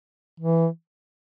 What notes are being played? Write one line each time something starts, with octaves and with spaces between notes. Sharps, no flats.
E3